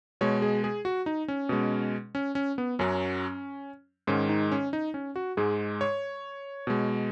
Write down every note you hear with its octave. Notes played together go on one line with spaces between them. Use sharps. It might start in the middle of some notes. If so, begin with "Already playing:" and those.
B2 G#3 C#5
G#4
G#4
F#4
D#4
C#4
B2 G#3
C#4
C#4
B3
F#2 F#3 C#4
G#2 D#3 G#3 C#4
D#4
C#4
D#4
C#4
F#4
G#2 G#3 G#4
C#5
B2 G#3